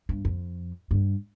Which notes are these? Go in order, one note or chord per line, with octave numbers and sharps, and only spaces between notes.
G2
F2
G2